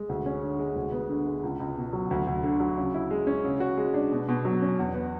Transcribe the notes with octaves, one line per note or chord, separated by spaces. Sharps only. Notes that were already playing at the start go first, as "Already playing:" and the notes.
Already playing: G#3
D2
C#4
D3
G#3
D2
B3
D3
G#3
C#2
C#2
B2
F#3
D2
D2
D3
F#3
C#3
E4
G#3
C#4
C#3
F#4
G#3
D4
B2
B2
F#3
C#4
E2
B3